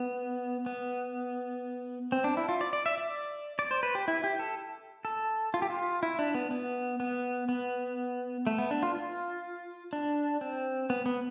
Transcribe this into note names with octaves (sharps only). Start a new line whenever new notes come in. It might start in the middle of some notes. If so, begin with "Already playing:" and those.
Already playing: B3
B3
C4
D4
E4
F4
D5
D5
E5
D5
D5
C5
B4
G4
E4
G4
A4
A4
F4
G4
F4
E4
D4
B3
B3
B3
B3
A3
B3
D4
F4
F4
D4
C4
B3
B3